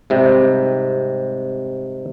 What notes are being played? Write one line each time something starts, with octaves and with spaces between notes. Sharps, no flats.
G#2 C3 G3